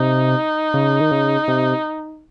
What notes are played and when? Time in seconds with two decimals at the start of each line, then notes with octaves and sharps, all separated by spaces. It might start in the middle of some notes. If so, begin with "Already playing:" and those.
Already playing: C3 D#4
0.74 C#3
1.01 D#3
1.11 C#3
1.48 C3